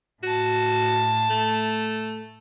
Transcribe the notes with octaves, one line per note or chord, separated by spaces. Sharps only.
A2 F#4 A5
A3